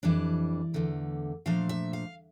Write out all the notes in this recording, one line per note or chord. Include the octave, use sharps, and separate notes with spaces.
F2 E3 G3 D4 D5
E2 D3 A3
A#2 F3 A3 D4 F5
E5
F5